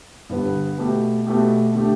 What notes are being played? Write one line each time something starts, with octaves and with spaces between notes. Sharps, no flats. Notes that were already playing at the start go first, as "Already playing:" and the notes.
G2 D3 B3 G4
B2 A3 G4
B2 A3 G4
D3 A3 G4